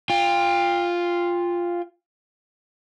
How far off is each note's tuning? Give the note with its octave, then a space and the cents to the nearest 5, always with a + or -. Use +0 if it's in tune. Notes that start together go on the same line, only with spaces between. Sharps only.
F4 +0 G5 +30